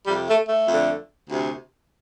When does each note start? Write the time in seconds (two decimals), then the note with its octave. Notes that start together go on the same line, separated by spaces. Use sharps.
0.07 F2 C3 G3
0.28 A3
0.49 A3
0.68 F2 D3
1.29 D2 C3